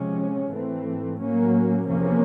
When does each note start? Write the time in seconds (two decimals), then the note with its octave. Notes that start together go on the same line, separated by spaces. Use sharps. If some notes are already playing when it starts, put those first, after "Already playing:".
Already playing: C3 F3 G#3 C#4
0.52 G#2 E3 A3 C4
1.20 A2 F#3 A#3 C#4
1.88 E2 C3 F3 A#3 C#4